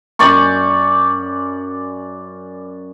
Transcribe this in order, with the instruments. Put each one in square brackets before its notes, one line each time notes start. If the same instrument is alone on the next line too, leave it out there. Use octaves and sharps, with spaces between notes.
[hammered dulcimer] F#2 D5 C6 C#6